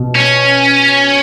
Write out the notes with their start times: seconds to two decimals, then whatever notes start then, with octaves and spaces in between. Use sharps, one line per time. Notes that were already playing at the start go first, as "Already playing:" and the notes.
Already playing: B2
0.15 C#4